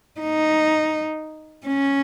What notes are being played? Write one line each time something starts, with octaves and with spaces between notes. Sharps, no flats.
D#4
C#4